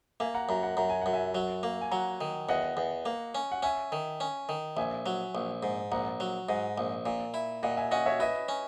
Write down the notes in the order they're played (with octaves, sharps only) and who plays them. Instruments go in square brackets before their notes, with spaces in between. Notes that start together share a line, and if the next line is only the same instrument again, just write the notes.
[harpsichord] A#3 [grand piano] E5 G#5
[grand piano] F#5 A#5
[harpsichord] F#2 [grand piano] F#5 A#5
[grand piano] F#5 A#5
[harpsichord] F#2 [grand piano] A#5
[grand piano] G#5
[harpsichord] F#2 [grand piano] F#5
[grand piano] E5 G#5
[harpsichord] F#3
A#3
[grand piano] G#5
[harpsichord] F#3 [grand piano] F#5 A#5
[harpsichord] D#3
[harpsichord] E2 [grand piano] D#5 F#5
[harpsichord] E2
A#3
C#4
[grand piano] F#5
[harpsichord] C#4 [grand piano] E5 G#5
[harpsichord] D#3
C#4
D#3
[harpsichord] A#1 [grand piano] E5 G#5
[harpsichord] F#3
A#1
G#2
[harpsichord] A#1 [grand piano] F#5 A#5
[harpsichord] F#3
[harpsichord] G#2 [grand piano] D#5 F#5
[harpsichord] A#1
A#2
E4
[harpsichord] A#2 [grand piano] D#5 F#5
[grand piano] E5 G#5
[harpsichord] C#4 [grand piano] D#5 F#5
[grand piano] C#5 E5
[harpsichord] E4 [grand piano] B4 D#5
[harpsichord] C#4